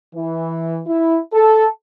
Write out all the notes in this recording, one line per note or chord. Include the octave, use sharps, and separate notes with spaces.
E3
E4
A4